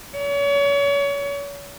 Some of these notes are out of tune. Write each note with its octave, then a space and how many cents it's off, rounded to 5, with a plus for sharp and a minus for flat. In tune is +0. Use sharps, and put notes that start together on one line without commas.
C#5 +35